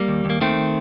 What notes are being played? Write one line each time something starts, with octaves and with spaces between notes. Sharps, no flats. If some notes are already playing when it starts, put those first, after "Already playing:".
Already playing: G3 A#3
D#2
D#2 A#3
D#3 A3 C4